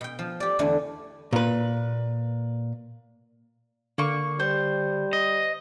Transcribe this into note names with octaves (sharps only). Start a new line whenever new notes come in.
B2 G5
F3
G4 D5
E2 D3 E3 A3 D4 D5
A#2 B4
D3 A#3 C#6
G3 C5
D#5